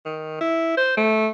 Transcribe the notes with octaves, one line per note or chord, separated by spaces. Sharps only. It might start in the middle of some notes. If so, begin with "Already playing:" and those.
D#3
E4
C5
A3